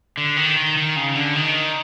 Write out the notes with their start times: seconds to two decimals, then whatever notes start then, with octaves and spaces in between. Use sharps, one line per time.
0.18 D3
0.37 D#3
0.57 D#3
0.77 D#3
0.96 C#3
1.16 D3
1.36 D#3